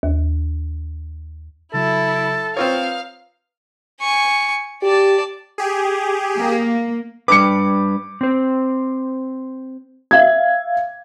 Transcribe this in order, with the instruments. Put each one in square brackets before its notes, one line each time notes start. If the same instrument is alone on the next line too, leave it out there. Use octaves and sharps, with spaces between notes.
[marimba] D#2
[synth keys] C#3 F#3 [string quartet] E4 [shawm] A4
[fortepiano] C4 F4 C#5 [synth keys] B4 A#5 D#6 [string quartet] F5
[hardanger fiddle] G#5 C#6
[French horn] G4 [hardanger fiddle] D5 A5
[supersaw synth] G4 G#4
[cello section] A#3
[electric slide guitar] G3 D4 B4 [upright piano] D6 C#7
[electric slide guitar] C4 C5
[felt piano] E5 F5 G#6